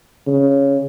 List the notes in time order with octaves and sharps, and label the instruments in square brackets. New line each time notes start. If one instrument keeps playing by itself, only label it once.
[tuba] C#3